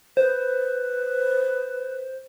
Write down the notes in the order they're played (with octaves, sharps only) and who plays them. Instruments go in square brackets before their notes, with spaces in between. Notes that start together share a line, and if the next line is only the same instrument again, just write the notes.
[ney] B4 [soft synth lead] C5